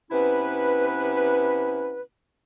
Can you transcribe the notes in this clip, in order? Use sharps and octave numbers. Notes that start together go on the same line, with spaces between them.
C3 B3 C#4 E4 B4